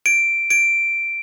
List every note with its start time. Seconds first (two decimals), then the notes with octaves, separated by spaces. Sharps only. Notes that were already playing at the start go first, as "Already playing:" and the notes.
0.06 D7
0.50 D7